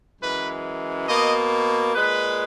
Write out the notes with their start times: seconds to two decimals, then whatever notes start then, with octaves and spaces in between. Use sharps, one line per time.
0.21 F#2 E3 G#3 B4
1.08 B2 A#3 D#5
1.95 A#2 G#3 B4